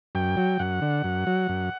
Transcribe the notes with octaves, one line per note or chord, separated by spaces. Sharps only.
F#2 G5
F#3
F#2 F#5
D3
F#2
F#3
F#2